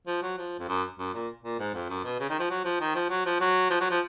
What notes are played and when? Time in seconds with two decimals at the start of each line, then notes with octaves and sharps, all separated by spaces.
0.07 F3
0.23 F#3
0.38 F3
0.60 F2
0.69 F#2
0.98 F#2
1.14 A#2
1.44 A#2
1.59 G#2
1.74 F2
1.89 F#2
2.04 B2
2.19 C#3
2.30 D#3
2.39 F3
2.50 F#3
2.65 F3
2.81 D#3
2.95 F3
3.10 F#3
3.26 F3
3.40 F#3
3.70 F3
3.81 F#3
3.91 F3